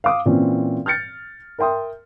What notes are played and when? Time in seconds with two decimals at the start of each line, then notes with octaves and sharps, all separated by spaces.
0.04 F5 D6 D#6
0.26 A#2 E3 C4 C#4
0.86 F6 G6 A6 C#7
1.59 A#4 E5 G5 C6 D#6